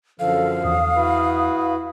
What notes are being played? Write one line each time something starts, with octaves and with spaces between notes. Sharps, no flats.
F#2 D3 F3 A4 F5
E2 D#6
E4 F#4 B4